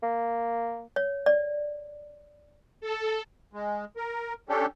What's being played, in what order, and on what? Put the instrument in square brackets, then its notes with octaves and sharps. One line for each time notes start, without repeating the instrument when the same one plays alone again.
[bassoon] A#3
[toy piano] C#5
D5
[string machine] A4
[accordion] G#3
A#4
C#4 D4 G4 A4